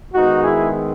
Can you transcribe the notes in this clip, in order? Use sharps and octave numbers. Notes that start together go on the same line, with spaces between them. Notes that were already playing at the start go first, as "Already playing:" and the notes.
D#3 G#3 B3 D#4 F#4
E4 G#4